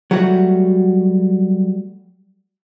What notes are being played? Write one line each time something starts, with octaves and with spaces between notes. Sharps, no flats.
F#3 G3 A3 F#4